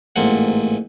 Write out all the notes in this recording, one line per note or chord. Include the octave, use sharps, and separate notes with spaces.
A1 G#2 A#3 C4 F#5